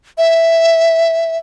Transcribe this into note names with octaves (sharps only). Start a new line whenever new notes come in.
E5